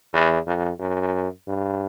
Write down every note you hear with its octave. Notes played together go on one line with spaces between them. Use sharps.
E2
F2
F#2
G2